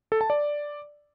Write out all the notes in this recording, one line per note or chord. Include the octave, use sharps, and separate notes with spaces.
A4
A5
D5